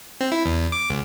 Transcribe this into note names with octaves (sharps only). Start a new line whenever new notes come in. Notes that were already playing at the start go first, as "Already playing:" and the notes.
C4
E4
E2
D6
C#2